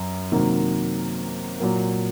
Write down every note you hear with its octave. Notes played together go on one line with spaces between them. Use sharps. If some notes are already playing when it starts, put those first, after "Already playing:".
Already playing: F#2
C3 D#3 F#3 A#3
A#2 F#3 A#3